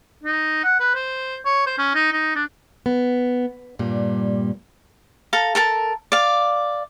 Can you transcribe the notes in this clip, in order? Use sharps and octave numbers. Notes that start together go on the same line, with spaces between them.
D#4
F#5
B4
C5
C#5
C5
C#4
D#4
D#4
D4
B3
G2 A#2 G3
A4 F5 A#5
A4 A#4 A5
D5 F5